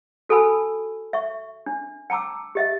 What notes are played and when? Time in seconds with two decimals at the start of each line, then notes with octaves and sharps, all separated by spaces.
0.29 F#4 A4 G#5 A5 B5 E6
1.13 E5 C#6
1.66 D4
2.10 G5 A5 A#5 D6 E6
2.55 G4 D#5 E5